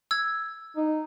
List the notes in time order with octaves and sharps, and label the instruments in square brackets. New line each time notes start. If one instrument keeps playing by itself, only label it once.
[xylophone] E6 G#6
[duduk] D#4